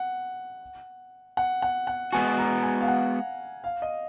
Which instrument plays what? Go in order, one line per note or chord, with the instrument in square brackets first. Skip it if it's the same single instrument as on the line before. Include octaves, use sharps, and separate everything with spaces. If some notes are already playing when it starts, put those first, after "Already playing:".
Already playing: [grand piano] F#5
F#5
F#5
F#5
[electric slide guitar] G#3 B3 F#4 [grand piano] G#5
[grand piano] A#5
G#5
F5
F#5
F5
D#5